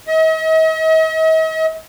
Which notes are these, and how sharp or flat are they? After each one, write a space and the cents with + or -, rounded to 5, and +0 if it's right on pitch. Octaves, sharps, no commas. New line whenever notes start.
D#5 +45